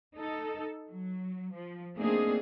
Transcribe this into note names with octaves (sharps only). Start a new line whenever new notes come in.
D#4 A4
F#3
F3
A3 A#3 C4 D4 D#4 G#4